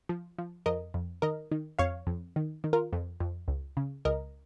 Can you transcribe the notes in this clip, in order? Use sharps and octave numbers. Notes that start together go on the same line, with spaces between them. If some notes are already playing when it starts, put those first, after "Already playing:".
F3
F3
F2 A#4 D#5
F2
D#3 A#4 D#5
D#3
F2 C#5 F5
F2
D#3
D#3
F4 A#4
F2
F2
C#2
C#3
C#2 A#4 D#5